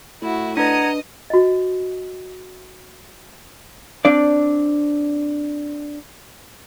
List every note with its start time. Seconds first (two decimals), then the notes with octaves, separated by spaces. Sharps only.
0.22 A2 E4 F#4
0.57 D4 B4 D#5 F#5 A#5 D#6 G#6
1.30 F#4 D#5
4.05 C4 D4 D5